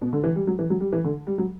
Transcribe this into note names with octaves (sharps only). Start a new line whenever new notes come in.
B2
D3
E3
G3
F#3
E3
F#3
G3
E3
D3
G3
F#3